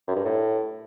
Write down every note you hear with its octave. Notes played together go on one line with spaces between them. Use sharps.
F#2
G2
A2